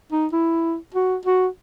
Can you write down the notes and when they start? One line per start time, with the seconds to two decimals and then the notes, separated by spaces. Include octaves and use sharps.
0.12 D#4
0.32 E4
0.94 F#4
1.25 F#4